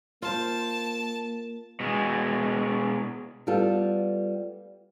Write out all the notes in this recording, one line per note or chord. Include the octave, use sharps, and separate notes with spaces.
A#3 F4 C5 A5
B2 G#3
G3 B3 F4 A4